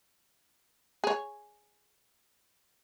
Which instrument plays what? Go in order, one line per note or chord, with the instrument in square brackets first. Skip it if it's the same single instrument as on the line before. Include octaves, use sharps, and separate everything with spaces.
[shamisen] G#4 C#5